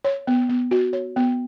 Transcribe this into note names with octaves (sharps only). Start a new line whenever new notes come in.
C#5
B3
B3
F#4
C#5
B3